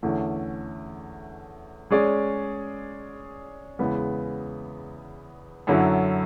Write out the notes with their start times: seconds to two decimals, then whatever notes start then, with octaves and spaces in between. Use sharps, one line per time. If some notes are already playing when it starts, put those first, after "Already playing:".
0.02 E2 D3 A3 C#4
1.90 G#3 C#4 G#4 D5
3.79 E2 C#3 G#3 B3
5.67 F#2 D3 F#3 C#4 E4